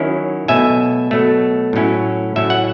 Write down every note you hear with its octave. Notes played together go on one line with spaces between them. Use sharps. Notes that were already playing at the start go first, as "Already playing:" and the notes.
Already playing: D#3 F#3 C#4 E4
B2 F#3 A3 E5 G#5
B2 F#3 A3
A2 F#3 C#4 E4
A2 F#3 C#4 E4 E5
F#5